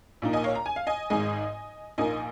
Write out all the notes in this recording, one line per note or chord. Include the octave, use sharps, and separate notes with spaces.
A#1 A#2 A#3 D#4
D#5 G#5
C#5 F5
A#5
G#5
F5
D#5 G#5
G#1 G#2 G#3 D#5 G#5
A#1 A#2 A#3 D#4 D#5 G#5